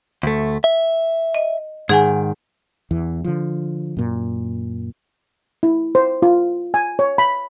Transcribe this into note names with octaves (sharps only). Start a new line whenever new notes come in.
D2 A3
E5
D#5
G#2 D#3 G#4 F#5 G#5
E2 E3
D3 F3
F#2 A#2
E4
C5
F4
G#5
C#5
B5